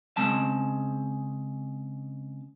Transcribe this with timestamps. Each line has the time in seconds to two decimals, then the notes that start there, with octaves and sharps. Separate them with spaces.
0.17 C#3 G#3 C4 A5